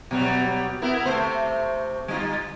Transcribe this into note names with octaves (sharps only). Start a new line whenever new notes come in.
B2 F#3 G3
B3 E4 A#4
C3 A3 C5
G3 D#4 F4